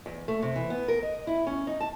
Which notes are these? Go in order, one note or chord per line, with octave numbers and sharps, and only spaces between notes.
E2
A3
C3
E3
B3
A#4
D#5
E4
C#4
D#4
A5